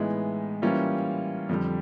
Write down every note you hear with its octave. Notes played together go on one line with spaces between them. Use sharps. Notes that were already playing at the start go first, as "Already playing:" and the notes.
Already playing: A2 E3 G#3 B3 D#4
E3 G3 A#3 C#4 F4
F2 D3 G3